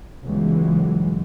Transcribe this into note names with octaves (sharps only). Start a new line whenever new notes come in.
G1 C#2 E3 F#3 G#3